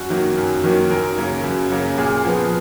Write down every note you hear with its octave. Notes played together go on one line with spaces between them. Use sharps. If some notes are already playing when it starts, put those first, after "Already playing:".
Already playing: F#2 F#4
D#3 F#3 A#3
F#2
D#3 F#3 A#3
F#2 A#4
C#3 F#3 A#3
F#2
C#3 F#3 A#3
A#2 G#4
F3 B3